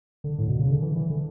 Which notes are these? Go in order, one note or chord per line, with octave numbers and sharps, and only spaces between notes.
D3
A2
B2
C#3
D3
E3
E3
D3